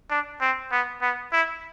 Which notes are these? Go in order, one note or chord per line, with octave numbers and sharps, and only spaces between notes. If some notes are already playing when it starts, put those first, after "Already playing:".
D4
C4
B3
B3
E4